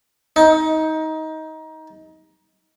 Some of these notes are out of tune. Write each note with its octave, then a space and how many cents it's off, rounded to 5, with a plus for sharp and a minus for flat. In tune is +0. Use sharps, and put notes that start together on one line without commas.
D#4 +20